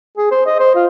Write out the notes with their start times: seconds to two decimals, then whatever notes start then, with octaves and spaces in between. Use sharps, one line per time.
0.18 G#4
0.31 C5
0.46 D#5
0.59 C5
0.75 F4